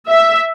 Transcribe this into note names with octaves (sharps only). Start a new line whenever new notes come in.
E5